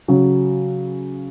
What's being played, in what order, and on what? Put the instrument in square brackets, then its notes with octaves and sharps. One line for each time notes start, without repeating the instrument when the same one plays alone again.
[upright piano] C#3 F#3